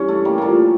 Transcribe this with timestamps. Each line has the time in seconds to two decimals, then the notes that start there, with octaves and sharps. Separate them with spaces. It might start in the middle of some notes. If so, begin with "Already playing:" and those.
Already playing: G2 E3 C#4
0.08 A3
0.25 G3 A#3
0.38 A#2 F3 A3 A#3